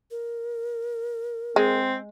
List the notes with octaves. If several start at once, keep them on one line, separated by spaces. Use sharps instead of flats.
A#4
G#3 C4